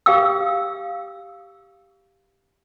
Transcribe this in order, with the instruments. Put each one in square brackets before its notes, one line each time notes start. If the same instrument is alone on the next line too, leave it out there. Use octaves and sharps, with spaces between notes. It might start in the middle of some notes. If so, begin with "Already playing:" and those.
[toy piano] G4 F5 G5 E6